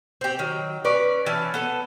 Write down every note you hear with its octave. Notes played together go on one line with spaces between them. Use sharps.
C4 G4
D#3 F#3
C#4 B4 D5
E3 C#4 A5
B3 A4 A5